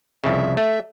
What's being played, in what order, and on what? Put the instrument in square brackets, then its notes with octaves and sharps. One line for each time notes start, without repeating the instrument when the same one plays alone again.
[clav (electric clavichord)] C2 F2 C#3 [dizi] E5
[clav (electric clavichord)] A3 [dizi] E5